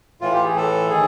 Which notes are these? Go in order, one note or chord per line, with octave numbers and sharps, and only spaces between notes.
A2 E3 F4
G4
G#4
A4
D#3 G#4